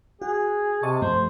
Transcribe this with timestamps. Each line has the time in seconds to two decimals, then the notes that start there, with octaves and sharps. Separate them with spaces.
0.22 F#4 G#4
0.83 C3 D#5 A5 C#6
1.02 G2 F3 A3 C5